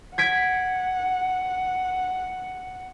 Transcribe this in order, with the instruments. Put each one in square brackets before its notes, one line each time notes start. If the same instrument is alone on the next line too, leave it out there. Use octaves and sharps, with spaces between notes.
[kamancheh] F#5 [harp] G#6 B6 D7